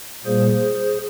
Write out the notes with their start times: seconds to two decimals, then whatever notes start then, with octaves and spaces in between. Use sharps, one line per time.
0.25 A#2 G3 A#3 G#4 C5